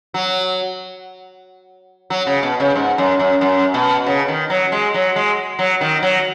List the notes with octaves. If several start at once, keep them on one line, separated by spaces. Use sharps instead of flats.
F#3
F#3
C#3
B2
C#3
G#2
F#2
F#2
F#2
B2
C#3
D#3
F#3
G#3
F#3
G#3
F#3
D#3
F#3